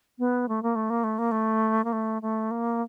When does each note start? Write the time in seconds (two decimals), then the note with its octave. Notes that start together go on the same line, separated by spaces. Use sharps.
0.19 B3
0.48 A3
0.63 A#3
0.75 A3
0.90 A#3
1.04 A3
1.18 A#3
1.31 A3
1.84 A#3
1.92 A3
2.22 A3
2.51 A#3